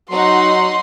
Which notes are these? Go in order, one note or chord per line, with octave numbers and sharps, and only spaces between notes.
F#3 D#4 F#5 C6